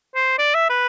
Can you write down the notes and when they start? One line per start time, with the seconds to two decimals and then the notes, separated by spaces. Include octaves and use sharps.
0.15 C5
0.38 D5
0.54 E5
0.70 B4